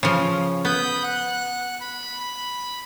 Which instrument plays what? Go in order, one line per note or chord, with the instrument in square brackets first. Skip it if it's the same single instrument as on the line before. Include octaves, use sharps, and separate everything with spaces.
[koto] C#3 F3 [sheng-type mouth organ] C#4
[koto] B3 [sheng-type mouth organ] B5 D#6 G6
[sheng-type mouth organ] F#5 F#6
B5